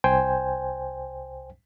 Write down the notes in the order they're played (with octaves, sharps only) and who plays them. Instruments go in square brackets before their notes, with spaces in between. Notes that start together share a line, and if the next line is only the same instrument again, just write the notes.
[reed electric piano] C2 C5 G5 G#5